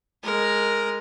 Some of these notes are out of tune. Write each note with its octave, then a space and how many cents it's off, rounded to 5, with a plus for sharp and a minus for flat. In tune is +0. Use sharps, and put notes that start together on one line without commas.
G#3 +0 A#4 +0